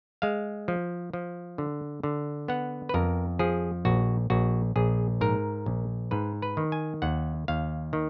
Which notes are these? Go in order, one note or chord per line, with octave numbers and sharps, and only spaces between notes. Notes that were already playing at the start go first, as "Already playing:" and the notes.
G#3 F5
F3
F3
D3
D3
B3 F#5
B4
F2 A#4
F3 G#4
A#1 F#4
A#1 F#4
A#1 G#4
G#2 A#4
A#1
G#2 B4
B4
D#3
G#5
D#2 F#5
D#2 F5
D#3